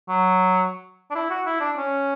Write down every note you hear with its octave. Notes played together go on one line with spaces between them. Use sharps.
F#3
D4
E4
F#4
E4
D4
C#4